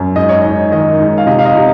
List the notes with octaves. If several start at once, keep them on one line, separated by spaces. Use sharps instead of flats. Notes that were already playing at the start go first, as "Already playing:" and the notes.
Already playing: F#2
G#2 D#5
C#5
G#2 D#5
D#3 D#5
G#2
F5
C3 D#5
F5
D#5
C3